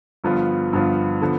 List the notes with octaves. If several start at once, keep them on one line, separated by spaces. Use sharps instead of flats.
G1 G2 F3 B3 F4
G1 G2 F3 B3 F4
D3 F3 B3